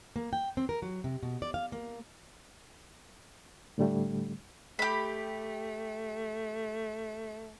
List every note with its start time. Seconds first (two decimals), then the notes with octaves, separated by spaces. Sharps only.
0.16 A#3
0.33 G5
0.57 C4
0.69 A#4
0.82 F#3
1.04 C3
1.23 B2
1.42 D5
1.54 F5
1.72 A#3
3.78 A2 D3 G3 A3
4.79 A3 G4 B5